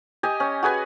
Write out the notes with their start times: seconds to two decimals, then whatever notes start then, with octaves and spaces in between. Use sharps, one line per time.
0.23 G4 D#5 G#5
0.40 C#4
0.63 F#4 G#4 B4 G#5